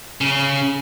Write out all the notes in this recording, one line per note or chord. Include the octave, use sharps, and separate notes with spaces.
C#3